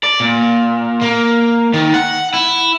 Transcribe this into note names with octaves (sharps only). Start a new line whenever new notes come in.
D5
A#2
A#3
D#3
F#5
E4